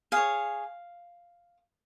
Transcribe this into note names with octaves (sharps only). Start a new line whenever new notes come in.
G#4 C#5 F5